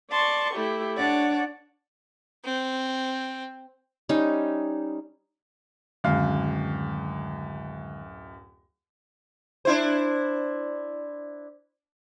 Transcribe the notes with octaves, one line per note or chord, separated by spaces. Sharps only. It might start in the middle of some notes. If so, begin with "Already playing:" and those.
D5 A5 C6 C#6
A3 E4 G4
D4 C#5 D5 F#5
C4
G3 C#4 D#4
D1 F#2 D3 D#3 G#3 F5
D4 E4 C5